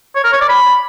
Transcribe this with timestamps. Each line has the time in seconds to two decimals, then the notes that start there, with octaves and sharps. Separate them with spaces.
0.15 C#5
0.24 A#4
0.32 C#5
0.41 D5
0.49 B5